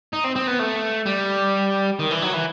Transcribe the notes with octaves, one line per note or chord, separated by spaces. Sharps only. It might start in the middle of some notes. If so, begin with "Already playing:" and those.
D#4
C4
C4
B3
A3
G3
D#3
E3
F#3
E3